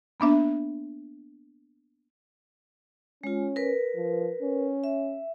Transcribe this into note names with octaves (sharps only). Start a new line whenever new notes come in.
A#3 B3 D4 E5
G#3 C#4 F4
A#4 B4
F3
C#4
E5